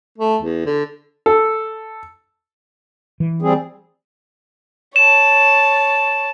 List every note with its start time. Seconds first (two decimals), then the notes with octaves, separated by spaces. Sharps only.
0.18 A3
0.42 E2
0.66 D3
1.26 A4
3.20 E3
3.42 G3 C4 G#4
4.96 C#5 A5 E7